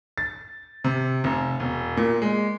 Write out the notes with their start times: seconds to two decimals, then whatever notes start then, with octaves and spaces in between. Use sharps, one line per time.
0.18 A6
0.84 C3
1.24 F1
1.60 E1
1.97 A#2
2.22 G#3